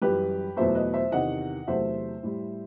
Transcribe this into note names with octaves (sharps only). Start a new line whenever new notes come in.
F#2 E3 G3 G4 B4
E2 B2 F#3 A3 C5 E5
B4 D#5
C5 E5
E2 C3 D#3 D#5 F#5
E2 C3 F#3 A3 C5 E5
A2 G3